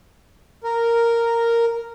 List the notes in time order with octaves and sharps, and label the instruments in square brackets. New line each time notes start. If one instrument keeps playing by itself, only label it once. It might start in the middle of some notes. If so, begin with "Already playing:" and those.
[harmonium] A#4